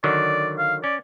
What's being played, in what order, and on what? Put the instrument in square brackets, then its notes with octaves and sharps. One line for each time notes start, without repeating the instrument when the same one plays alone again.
[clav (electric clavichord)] D3 D#3 F#3 [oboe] D5
[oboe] F5
[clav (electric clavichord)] C#4 [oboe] D5